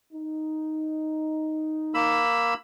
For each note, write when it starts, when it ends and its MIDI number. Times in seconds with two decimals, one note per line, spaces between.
0.13 2.28 63
1.94 2.54 58
1.94 2.54 83
1.94 2.54 88